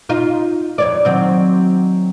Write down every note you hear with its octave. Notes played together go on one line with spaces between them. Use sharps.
D#4 F4
F2 C#5 D5
D#3 F#3 C4